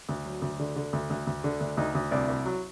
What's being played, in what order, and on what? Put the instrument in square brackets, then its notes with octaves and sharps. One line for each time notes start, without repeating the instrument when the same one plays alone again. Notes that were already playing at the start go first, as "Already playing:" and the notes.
[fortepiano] D2
F#3
D2
D3
D3
D2
D2
D2
D3
D2
D2 D#4
D2
C2 D5
C2
F#3